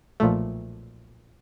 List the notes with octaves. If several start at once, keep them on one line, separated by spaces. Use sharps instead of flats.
B1 A#2 F3 A3